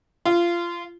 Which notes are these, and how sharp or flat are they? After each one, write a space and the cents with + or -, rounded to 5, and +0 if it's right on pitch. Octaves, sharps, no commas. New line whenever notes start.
F4 -20